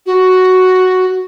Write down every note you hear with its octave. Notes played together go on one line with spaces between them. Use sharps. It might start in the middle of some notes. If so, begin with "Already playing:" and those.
F#4